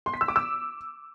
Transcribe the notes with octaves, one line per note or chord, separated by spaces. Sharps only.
C6
B6
E6
D6
E6